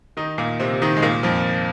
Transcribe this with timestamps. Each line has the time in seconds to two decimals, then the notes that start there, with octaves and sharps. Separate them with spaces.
0.17 D#3 D#4
0.38 A#2 A#3
0.60 C3 C4
0.82 D#3 D#4
0.97 G#3
1.02 A#2 A#3
1.23 F2 F3